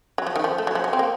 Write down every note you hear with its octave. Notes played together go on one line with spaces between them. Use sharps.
F#3
F3
D#3
F3
A3
F#3
F3
F#3
C4
A#3